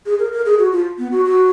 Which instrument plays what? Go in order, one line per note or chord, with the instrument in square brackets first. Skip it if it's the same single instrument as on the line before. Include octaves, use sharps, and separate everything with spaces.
[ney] G#4
A#4
A#4
G#4
F#4
F4
B3
F#4
F#4